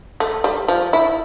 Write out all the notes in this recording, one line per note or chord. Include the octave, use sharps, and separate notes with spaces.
A3
G3
F3
E4